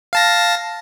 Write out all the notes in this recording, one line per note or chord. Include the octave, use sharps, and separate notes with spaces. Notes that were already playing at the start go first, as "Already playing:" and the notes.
F5 A5 A#6